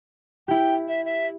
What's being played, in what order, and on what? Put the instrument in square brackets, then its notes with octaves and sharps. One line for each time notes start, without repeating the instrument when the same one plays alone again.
[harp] E4 G4 [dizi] G5
[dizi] E5
E5